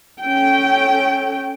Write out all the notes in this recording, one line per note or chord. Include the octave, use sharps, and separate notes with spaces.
C#4 A4 G5